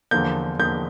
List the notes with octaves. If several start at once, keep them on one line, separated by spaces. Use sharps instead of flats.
E2 D3 F3 A#3 G6
E2 D3 F3 A#3 G6